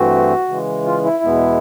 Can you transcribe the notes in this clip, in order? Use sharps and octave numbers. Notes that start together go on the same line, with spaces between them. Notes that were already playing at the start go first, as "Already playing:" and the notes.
Already playing: G2 E3 A3 C4 F#4
C#3 E3 G#3
F4
E4
E2 B2 G#3 B3